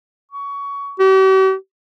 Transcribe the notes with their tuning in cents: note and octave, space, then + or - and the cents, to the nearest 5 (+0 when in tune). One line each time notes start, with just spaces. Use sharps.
C#6 +20
G4 -45